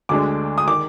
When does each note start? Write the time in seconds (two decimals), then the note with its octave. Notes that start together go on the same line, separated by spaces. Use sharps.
0.09 D2 D3 G#3 D4 D6
0.58 D#6
0.67 D#3 D6